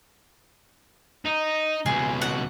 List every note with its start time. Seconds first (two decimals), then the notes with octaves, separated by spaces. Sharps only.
1.25 D#4
1.86 C#2 B2 G#4
2.22 F#5